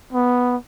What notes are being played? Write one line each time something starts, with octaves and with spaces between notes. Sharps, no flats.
B3